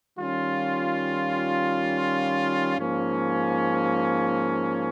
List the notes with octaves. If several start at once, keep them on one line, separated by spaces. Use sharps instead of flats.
D#3 G3 C#4 F4
G#2 F3 A#3 C#4